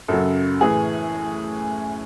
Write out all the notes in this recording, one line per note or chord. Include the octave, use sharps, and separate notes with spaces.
F#2 C#3 F#3 A4
A2 E3 G#4